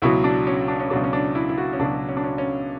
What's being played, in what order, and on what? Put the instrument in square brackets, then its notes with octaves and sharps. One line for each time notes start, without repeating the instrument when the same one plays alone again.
[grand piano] C#2 B2 F#3 E4
D4
C#4
D4
C#4
C#2 B2 F#3 D4
C#4
D4
E4
E4
F#4
C#4
C#2 B2 F#3 D4
C#4
D4
C#4
C#4